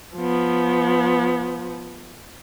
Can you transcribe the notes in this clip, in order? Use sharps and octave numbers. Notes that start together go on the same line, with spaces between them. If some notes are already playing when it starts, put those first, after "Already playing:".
F3 B3